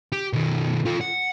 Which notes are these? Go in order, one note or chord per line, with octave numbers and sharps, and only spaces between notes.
G4
B2 D#3
F4 A4
F#5